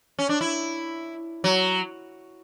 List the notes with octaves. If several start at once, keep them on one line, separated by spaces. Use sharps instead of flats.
C#4
D4
E4
F#3